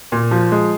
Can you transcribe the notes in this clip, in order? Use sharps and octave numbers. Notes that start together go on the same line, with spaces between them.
A#2
F3
G#3